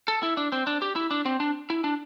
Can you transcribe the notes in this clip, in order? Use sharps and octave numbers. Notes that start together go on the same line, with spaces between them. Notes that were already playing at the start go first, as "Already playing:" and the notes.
A4
E4
D4
C4
D4
G4
E4
D4
C4
D4
E4
D4